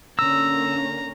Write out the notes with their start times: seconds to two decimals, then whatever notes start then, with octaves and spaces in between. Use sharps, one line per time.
0.19 D3 A#3 C#4 A#5 E6